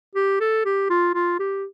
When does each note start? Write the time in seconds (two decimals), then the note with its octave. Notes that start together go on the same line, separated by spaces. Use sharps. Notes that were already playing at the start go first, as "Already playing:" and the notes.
0.15 G4
0.40 A4
0.65 G4
0.90 F4
1.15 F4
1.39 G4